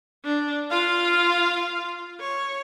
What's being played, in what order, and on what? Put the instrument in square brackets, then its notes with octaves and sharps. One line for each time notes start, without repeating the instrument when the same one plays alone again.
[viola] D4
F4 F5
C#5